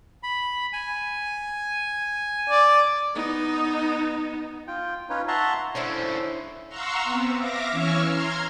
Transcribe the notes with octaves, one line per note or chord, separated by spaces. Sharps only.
B5
G#5
D5
B3 D#4
F4 G5
C#4 D#4 F4 B4 C#5
E5 F#5 A5 A#5 C6 C#6
D3 C#4 E4 C5 C#5
F5 F#5 A#5 C6 C#6 E6
B3 C4
E5 F5 D6 A#6
E3 C#4 C#5 C#6 E6 F6
A#5 C6 F6 G#6